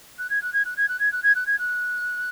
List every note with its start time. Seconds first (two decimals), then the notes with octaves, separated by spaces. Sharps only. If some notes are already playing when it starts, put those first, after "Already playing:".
0.18 F#6
0.30 G#6
0.42 F#6
0.53 G#6
0.65 F#6
0.77 G#6
0.88 F#6
0.99 G#6
1.12 F#6
1.23 G#6
1.35 F#6
1.46 G#6
1.58 F#6